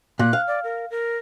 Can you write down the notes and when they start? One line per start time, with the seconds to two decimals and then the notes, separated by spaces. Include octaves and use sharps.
0.19 A#2 F#6
0.33 F5
0.47 D5
0.64 A#4
0.91 A#4